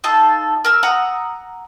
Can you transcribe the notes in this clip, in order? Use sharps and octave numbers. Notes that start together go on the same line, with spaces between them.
D#4 F4 A4 A5
A#4 E6
F#5 A#5 D#6 E6